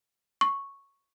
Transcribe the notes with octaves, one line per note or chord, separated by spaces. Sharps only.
C#6